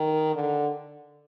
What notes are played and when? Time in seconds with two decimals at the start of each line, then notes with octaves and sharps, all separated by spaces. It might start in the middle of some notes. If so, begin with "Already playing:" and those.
Already playing: D#3
0.35 D3